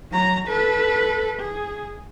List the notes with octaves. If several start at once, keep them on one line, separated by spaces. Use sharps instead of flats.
F#3 A#5
A4 B4
G#4